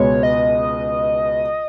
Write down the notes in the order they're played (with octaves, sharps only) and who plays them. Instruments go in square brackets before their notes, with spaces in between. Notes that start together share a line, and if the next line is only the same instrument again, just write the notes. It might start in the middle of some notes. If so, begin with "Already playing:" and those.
Already playing: [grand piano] C#2 B2 G#3 B3 [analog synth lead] C#5
[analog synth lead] D#5